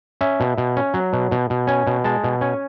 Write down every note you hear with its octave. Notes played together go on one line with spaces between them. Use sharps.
C#4 E5
B2
B2
C#4
F#3
B2
B2
B2
C#4 G#5
B2
G#3 A5
B2
C#4 G#5